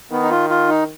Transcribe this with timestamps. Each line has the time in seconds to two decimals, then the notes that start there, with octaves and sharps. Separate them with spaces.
0.11 D#3 B3
0.22 D#4
0.30 F4
0.50 F4
0.68 D#4